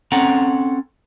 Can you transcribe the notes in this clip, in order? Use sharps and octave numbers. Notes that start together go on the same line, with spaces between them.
C4 C#4 A4 F#5 A#5